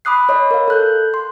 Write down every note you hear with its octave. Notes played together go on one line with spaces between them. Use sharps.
B5 D6 D#6 F#6 C7
C#5 D#5 B5
A#4 F5
A4 F#6 G6
C6